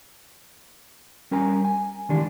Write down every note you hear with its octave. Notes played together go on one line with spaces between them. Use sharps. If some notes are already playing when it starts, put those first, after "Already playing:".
G3 C#4 A#4 G#5 A#5
G#5
D#3 E3 G#3 D4 G4